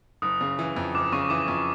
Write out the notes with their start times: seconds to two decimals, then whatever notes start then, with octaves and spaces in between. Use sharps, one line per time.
0.22 F#1 D#6
0.41 C#3
0.59 E3
0.76 F2
0.94 F#1 D6
1.12 C#3 C#6
1.30 E3 D6
1.48 F2